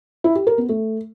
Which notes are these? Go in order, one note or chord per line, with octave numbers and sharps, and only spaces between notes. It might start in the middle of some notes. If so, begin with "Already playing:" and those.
E4
G4
A#4
B3
A3